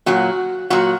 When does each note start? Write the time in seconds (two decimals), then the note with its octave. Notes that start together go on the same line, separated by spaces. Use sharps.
0.06 A#2 F#3 F#4
0.70 A#2 F#3 F#4